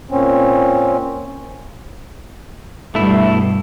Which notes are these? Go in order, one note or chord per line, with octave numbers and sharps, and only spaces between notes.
A#2 C4 C#4
G2 B2 A3 E4